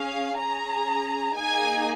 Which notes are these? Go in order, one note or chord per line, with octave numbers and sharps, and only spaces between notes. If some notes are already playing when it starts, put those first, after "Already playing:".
Already playing: C#4 G#4 F5
C#4 G#4 A#5
A#3 D#4 G#4 G#5